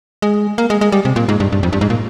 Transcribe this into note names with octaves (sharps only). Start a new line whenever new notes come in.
G#3
A#3
G#3
G#3
G3
C3
A#2
G#2
G2
G2
F2
G2
G#2
A#2